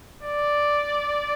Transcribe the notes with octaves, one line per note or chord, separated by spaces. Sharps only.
D5